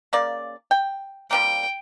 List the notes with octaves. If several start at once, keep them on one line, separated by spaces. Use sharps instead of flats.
C#3 A#3 D5
G5
F3 G3 A#3 G5